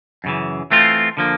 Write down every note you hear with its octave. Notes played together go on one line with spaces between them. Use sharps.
F#2 C#3 E3
E3 A3 C4 F4
D3 F3 A#3